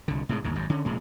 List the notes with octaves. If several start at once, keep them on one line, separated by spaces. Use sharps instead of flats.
C2 D3
A2 C3 G#3
G1 D#2 A2
G#1 F#2
D3 C#4
F1 A#2 G#3